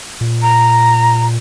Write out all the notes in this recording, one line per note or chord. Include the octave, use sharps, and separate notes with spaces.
A#2
A#5